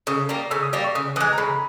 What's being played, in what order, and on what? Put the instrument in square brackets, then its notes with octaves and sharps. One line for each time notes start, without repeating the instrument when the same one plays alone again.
[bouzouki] C#3 [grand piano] D#6
[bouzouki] G3 A#3
[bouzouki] C#3 [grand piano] E6
[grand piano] D#6
[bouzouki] G3 A#3
[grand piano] C#6
[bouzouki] C#3 [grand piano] D#6
[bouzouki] E3 [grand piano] D#6
[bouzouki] G#3
[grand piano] A#5
[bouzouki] C#3 [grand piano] B5